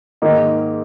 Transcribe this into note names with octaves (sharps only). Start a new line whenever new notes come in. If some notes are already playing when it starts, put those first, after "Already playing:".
G#2 D#3 A#3 D#4